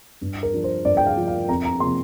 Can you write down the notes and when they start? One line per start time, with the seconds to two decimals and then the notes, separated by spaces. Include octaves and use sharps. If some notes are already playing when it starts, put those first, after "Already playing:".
0.21 G2
0.43 A#4
0.53 F3 D4
0.64 C5
0.85 G2 D5
0.97 G5
1.06 F5
1.17 F3 D4
1.28 F5
1.49 F2 A#5
1.65 A#5
1.80 C3 F3 A#3 C6